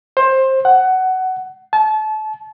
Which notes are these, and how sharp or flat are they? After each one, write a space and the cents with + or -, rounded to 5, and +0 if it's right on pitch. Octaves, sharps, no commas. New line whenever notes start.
C5 +20
F#5 +15
A5 -30